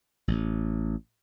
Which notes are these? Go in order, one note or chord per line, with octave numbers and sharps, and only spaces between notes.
A1